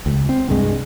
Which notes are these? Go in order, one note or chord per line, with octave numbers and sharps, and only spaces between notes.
C#2
C4
C2 G2 G#3